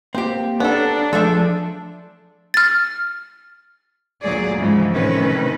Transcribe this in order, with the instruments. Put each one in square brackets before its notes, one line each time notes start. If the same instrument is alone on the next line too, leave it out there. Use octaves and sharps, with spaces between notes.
[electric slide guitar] A#3 [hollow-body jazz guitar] C4 G4 [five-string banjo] C5
[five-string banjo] B3 A4 [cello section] D4 [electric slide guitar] C#5 A#5
[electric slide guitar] F3 [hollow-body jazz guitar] G#3 A3 E5 [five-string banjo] A4
[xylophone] F6 A6
[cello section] D2 A#2 F#3 G#4 D5
G#2 C#3 E3 F3 G#3
A2 C3 D#3 C#4 B4